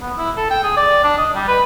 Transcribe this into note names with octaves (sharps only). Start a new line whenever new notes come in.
B3
E4
A4
G5
G#4
D5
D4
D#5
G3
B4